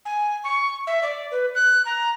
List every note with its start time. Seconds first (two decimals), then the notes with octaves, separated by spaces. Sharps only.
0.05 G#5
0.44 C#6
0.87 E5
1.03 D5
1.31 B4
1.55 F#6
1.85 A#5